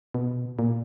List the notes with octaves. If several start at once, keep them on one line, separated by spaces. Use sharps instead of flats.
B2
A#2